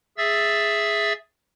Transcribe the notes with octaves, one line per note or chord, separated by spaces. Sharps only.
G#4 E5 E6 A6